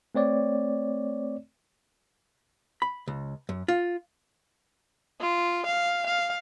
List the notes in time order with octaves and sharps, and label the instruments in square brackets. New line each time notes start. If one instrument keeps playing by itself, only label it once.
[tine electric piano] A3 C4 C#5 D5
[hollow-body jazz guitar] B5
C#2
F#2
F4
[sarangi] F4
F5
F5